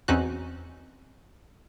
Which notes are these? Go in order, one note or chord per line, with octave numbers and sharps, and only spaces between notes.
E2 C4 C#4 D#4 F#4 F#6